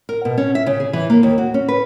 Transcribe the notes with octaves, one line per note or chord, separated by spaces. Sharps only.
A#4
B2
C#4
E5
C#3
G#4
E3
A#3
D#2
F#4
C#4
B4